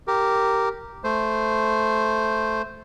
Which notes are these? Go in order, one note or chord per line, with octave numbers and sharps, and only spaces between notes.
G4 A#4
A3 C5